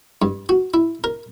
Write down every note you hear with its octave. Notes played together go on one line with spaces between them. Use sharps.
G2
F#4
E4
A#4